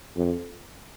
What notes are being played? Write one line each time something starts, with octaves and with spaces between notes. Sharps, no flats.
F2